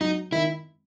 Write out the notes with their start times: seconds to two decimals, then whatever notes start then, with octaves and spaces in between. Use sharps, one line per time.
0.01 F#3 D#4
0.32 D#3 E4